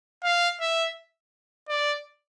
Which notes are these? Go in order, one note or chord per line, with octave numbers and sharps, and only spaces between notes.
F5
E5
D5